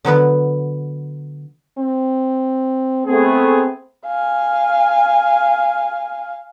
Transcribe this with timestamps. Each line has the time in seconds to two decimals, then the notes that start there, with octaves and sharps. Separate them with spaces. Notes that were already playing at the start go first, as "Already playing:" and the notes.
0.05 D3 F#3 B3 B4
1.78 C4
3.06 A3 B3 C4 G#4
4.06 F5 G#5